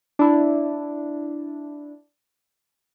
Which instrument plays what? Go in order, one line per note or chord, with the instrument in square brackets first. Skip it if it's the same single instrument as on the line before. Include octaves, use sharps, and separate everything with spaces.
[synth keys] D4 E4